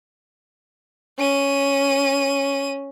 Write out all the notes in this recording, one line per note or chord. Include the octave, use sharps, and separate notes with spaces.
C#4 D#7